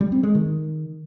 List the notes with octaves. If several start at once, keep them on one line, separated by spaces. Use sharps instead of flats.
G3
C4
G#3
D#3